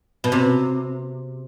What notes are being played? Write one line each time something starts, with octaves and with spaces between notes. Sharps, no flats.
B2
C3